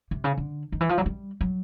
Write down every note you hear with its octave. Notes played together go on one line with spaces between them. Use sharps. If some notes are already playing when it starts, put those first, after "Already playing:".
C3
C#3
D3
D#3
E3
F3
F#3
G3
F#3